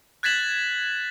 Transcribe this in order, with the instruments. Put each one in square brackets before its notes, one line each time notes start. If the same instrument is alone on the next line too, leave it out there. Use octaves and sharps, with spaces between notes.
[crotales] F#6 G#6 A6 B6 E7 F#7